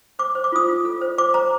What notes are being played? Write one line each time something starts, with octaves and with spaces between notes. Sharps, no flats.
C5 D6
C5
D6
F4 D#6
F4
A4
C5
C5 D6
C5 A#5